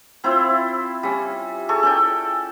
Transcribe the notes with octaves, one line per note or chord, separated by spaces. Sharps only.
C4 E4 F4 C5
G3 C#4
G#4 A4 C#6
C#4 A4 D5 G5